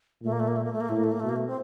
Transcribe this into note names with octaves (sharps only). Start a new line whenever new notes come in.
A#2 A3
A#3
A3
A#3
A3
A#3
A3
A#3
A2 A3
A#3
A3
A#3
A3
B2
A#3
A3
C4